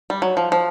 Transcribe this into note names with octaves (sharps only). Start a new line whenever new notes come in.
G3
F#3
F3
F3